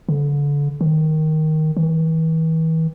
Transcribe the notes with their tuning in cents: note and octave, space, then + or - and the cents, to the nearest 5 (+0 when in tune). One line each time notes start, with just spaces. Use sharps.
D3 -30
D#3 +5
E3 -40